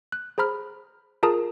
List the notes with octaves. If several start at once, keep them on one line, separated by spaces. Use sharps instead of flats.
F#6
G#4 C5 A#5 B5 F6
F4 G#4 A#4 A5 A#5 D#6